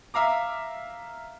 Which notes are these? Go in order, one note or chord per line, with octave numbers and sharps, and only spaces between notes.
E5 F5 A#5 D6